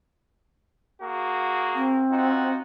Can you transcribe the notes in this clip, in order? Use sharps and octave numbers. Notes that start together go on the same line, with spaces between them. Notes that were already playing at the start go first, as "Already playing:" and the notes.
A#3 F#4 G#4
C4
D#4 F4 F#4